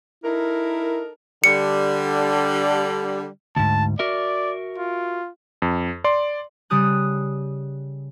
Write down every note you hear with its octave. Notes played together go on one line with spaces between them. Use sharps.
D#4 E4 A4 A#4
D3 G3 C#7
D2 G#2 A5
F#4 A#4 D5 E5
F4
F2
D5 C6
C#3 G3 G4 D#6 F#6